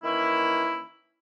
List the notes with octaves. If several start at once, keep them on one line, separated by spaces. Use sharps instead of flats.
D#3 E3 A#3 C#4 E4